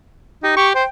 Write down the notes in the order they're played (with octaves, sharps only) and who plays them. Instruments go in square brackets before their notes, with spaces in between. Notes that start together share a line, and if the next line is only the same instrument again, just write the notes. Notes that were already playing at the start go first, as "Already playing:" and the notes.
[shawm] D#4 [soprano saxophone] G4
[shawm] G4 [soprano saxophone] C#6
[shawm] C5 [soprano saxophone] G5